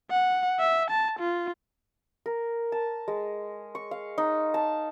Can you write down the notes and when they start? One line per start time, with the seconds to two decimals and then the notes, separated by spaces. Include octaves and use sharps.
0.10 F#5
0.59 E5
0.91 A5
1.19 F4
2.26 A#4
2.72 A5
3.08 G#3
3.75 C#6
3.91 F5
4.18 D#4
4.54 A5